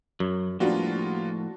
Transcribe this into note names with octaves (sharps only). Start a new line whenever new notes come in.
F#2 F#3
A2 F3 G3 A#3 B3 D4 F4 F#4